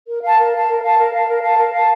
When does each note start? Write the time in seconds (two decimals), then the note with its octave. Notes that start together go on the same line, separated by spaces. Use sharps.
0.08 A#4
0.23 F5 A5
0.38 A#4
0.53 F5 A5
0.68 A#4
0.83 F5 A5
0.98 A#4
1.13 F5 A5
1.29 A#4
1.44 F5 A5
1.59 A#4
1.74 F5 A5